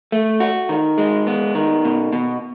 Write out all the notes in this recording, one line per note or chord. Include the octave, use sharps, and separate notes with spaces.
A3
F#4
D#3
G#3
B3
D#3
B2
B2